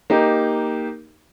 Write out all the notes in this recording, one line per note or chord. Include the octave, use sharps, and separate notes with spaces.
A#3 D#4 G4